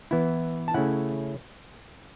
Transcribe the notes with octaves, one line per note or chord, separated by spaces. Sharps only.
E3 B3 E4
A5
C#3 A3 C#4 E4 F#5